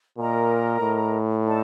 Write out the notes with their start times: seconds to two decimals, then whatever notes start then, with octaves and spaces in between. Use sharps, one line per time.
0.17 A#2 A#4 D#5 A#5
0.81 A2
1.44 D#4 A4 D5 A5